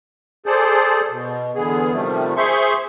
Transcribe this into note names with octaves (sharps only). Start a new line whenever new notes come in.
G#4 A4 C5 D5
B2
E2 D3 B3 G#4
C3 D#3 F3 G3 A3
G#4 C5 E5 C6 C#6